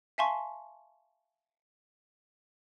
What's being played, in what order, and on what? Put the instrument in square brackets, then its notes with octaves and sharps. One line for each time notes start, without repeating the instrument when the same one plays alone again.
[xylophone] E5 F5 G#5 A5 C6 C#6